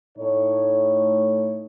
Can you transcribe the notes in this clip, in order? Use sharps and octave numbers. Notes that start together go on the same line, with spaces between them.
A2 A3 D#4 C#5